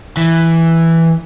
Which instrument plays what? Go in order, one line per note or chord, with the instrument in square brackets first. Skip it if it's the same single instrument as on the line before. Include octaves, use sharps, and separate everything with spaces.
[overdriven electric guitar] E3